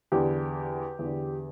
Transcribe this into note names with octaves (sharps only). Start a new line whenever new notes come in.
E2 D3 G4
E2 D3